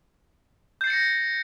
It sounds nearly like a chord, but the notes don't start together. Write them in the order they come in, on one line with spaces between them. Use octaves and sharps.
G6 C7 A6 C#7 A#6